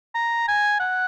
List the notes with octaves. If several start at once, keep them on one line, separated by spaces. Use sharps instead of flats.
A#5
G#5
F#5